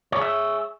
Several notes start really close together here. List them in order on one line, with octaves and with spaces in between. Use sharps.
C#5 G#4 E5